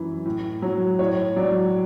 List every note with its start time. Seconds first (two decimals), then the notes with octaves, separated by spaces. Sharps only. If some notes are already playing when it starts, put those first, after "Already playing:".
Already playing: F#2 E3
0.26 A2
0.62 F#3
0.99 A2 C#5
1.36 F#3 D5